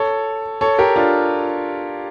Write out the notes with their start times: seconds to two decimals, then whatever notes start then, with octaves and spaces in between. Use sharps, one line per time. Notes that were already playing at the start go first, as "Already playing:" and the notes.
Already playing: A4 C#5
0.61 A4 C#5
0.78 G4 A#4
0.96 D4 F4